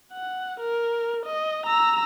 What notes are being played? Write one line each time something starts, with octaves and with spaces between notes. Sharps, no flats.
F#5
A#4
D#5
A#5 E6